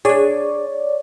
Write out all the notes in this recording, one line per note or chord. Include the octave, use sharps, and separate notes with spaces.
D4 G#4 C#5 D5